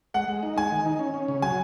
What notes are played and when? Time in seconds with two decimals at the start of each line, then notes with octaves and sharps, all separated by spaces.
0.14 G#3 F#5
0.28 G#3
0.43 D#4
0.56 G#3 G#5
0.72 D#3
0.86 D#4
0.99 C#4
1.14 C#4
1.28 C#3
1.42 F#3 G#5